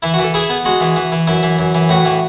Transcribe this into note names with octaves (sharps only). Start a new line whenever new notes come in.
E3 E4
F#4
E3
A4
E4 G#4
B3
G#3 F#4
E3
E3
E3
F#2 E4
E3
F#2
E3
A2 F#4
E3